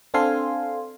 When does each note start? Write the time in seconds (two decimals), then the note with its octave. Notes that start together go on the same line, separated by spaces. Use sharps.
0.14 C4 D4 A4 F5 G#5 C6